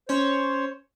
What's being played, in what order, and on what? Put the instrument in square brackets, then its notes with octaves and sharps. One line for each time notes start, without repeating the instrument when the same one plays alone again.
[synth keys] C#4 C#5 [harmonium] C5